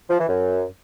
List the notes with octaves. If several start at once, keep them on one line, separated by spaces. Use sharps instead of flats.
F3
E3
F#2